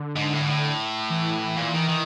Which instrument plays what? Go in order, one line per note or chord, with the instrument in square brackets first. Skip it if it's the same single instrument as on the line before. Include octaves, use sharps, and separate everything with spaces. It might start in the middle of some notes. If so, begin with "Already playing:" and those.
Already playing: [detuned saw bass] D3
[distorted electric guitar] G#2
A2
G#2
A2
[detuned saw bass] E3
[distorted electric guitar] A#2
D#3
D#3